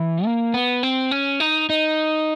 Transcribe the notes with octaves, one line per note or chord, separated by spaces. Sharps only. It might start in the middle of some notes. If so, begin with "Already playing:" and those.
Already playing: E3
A#3
B3
C4
C#4
D#4
D#4